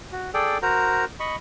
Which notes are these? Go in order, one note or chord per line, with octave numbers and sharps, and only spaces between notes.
F#4
G#4 A4 D5 G5
F#4 A#4 C5 A#5
D#5 B5 C#6